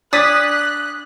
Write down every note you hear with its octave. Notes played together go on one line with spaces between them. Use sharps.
D4 D5 D6 D#6 F#6 G#6 B6